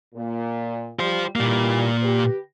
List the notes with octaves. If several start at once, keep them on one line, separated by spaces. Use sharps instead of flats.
A#2
G3 F4 C5
A#2 D#3 E3 G3 A#3
G4 B4